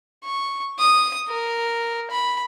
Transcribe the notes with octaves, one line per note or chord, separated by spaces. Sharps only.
C#6
D#6
A#4
B5